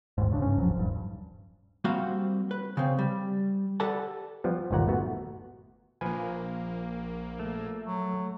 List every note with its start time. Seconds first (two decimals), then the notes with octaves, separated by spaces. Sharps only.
0.18 G#1 D#2 G#2
0.30 G#2 C#3 D4
0.42 G2 C#4
0.56 D#1 A1 F3 F#3
0.76 D#1 G2
1.84 G3 A#3 C4 F#4 C5 F5
2.51 B4
2.77 C#3 C4
2.99 G3
3.80 G4 A4 B4 D5 F#5 A5
4.44 F3 G3 B3
4.71 G1 D#2 A#2 F#5 A#5
4.88 A3 B3 F#4
6.01 A#1 F3 A#3 B4 G#5
7.39 A3
7.84 F#3